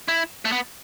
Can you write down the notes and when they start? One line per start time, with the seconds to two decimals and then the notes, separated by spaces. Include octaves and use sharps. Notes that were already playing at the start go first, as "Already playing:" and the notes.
0.08 E4
0.45 A3
0.52 B3